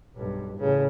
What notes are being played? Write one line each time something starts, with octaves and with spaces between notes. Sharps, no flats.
B1 G2
A1 C#3